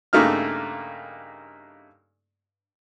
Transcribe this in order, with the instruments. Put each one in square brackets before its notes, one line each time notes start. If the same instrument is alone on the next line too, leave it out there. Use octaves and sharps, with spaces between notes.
[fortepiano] G2 C#3 A3 A#3 D#4 F6